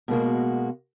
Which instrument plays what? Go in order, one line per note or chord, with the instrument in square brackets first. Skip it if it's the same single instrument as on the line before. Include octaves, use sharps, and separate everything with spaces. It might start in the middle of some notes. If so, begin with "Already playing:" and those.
[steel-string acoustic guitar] B2 G#3 A#3 F#4